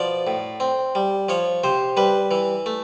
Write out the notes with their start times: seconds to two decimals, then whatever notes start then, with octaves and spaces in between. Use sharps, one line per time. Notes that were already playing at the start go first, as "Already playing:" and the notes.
Already playing: B2 F3 D5
0.27 A2
0.60 C4
0.95 G3
1.29 F3 C#5
1.64 C3 C5
1.97 G3 B4
2.31 E3
2.66 A3